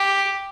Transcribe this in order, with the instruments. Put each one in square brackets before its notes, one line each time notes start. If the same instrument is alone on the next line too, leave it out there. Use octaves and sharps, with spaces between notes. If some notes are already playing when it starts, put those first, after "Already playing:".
Already playing: [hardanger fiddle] G4